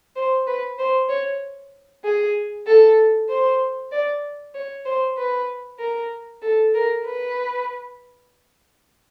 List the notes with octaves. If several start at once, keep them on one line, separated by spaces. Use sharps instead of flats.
C5
B4
C5
C#5
G#4
A4
C5
D5
C#5
C5
B4
A#4
A4
A#4
B4